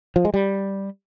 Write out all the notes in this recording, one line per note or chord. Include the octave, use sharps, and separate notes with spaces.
F3
G#3
G3